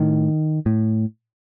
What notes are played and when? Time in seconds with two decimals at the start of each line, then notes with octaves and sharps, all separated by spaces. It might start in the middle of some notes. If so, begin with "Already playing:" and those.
Already playing: A2 D#3
0.66 A2